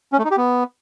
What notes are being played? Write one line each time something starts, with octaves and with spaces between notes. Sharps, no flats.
C#4
A3
D#4
G4
B3